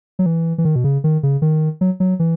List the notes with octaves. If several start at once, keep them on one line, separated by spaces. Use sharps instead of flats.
F#3
E3
E3
D#3
B2
C#3
D#3
C#3
D#3
F#3
F#3
E3